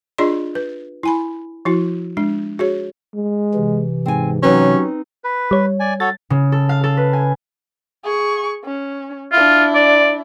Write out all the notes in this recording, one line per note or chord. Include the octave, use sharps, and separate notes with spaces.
D4 F4 G#4 D5 D#5 C6
B4
E4 G#5 B5
F3 E4 F#4
G#3 D4
F#4 G#4 C#5
G#3
C3 E3
G#2 C4 G#5
F#3 C4 C#4 D#4 B4
B4
G3 C#5
D5 G#5
F#4 A4 C#5 A6
C#3
A4
F5
A4
B4
G#5
G#4 C#6
C#4
D4 E4 F4
D5